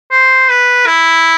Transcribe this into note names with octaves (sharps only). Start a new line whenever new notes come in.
C5
B4
E4